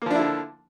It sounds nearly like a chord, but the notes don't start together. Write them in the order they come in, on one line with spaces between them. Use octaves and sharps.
A#3 F3 D4 E4 D3